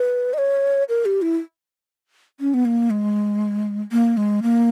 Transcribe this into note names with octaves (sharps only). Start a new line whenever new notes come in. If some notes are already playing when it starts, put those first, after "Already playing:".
Already playing: B4
D#5
C#5
A#4
G4
E4
C#4
B3
A#3
G#3
A#3
G#3
A#3